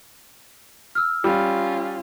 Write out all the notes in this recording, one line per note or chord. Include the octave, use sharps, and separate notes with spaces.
E6 F6
G3 C#4 F4